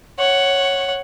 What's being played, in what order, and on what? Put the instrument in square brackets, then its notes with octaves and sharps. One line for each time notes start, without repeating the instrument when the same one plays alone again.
[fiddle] C#5 F#5